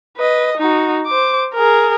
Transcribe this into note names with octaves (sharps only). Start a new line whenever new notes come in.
B4 D#5
D#4 F#4
C5 D6
G#4 A#4